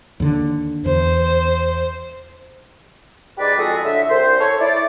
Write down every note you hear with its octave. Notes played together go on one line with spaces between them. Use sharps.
D#2 D3
E2 C5
G#2 G4 B4 D5
F2 G#3 F#4 G#4 A4
A2 D3 E5
C2 C5
A4 C#5
E4 D5